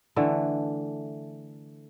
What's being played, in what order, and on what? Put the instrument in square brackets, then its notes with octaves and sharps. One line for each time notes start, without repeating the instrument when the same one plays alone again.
[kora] D3 E3 A3